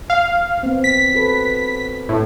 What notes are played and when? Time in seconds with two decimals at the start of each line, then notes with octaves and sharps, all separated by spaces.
0.10 F5
0.63 B3 C4
0.84 B6
1.14 F#4 A4 B4
2.09 A2